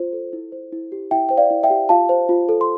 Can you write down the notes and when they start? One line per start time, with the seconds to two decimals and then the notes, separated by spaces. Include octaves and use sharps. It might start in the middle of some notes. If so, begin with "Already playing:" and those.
Already playing: F4 C5
0.13 A4
0.33 E4
0.52 C5
0.72 E4
0.92 G4
1.11 E4 E5 G5
1.29 C5 G5
1.37 D5 F5
1.50 E4
1.63 E5 G5
1.70 G4
1.89 F4 F5 A5
2.09 C5
2.29 F4
2.49 A4
2.61 C6